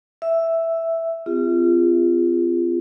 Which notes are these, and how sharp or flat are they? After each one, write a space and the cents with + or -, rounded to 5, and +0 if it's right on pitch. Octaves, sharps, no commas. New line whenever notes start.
E5 +0 E6 +0
C4 -30 F4 -25 G#4 -40